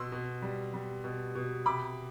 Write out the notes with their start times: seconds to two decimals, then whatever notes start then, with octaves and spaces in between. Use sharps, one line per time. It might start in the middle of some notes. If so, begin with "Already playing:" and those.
Already playing: B2 C6 E6
0.12 B2
0.42 G3
0.74 G3
1.04 B2
1.35 B2
1.66 C3 B5 D6